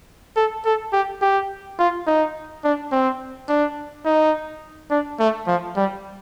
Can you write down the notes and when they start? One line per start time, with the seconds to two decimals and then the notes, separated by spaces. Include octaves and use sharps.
0.37 A4
0.66 A4
0.93 G4
1.22 G4
1.79 F4
2.07 D#4
2.64 D4
2.92 C4
3.49 D4
4.06 D#4
4.91 D4
5.19 A3
5.47 F3
5.76 G3